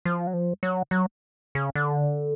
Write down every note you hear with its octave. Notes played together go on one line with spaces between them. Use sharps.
F3
F#3
F3
F#3
F#3
C#3
D3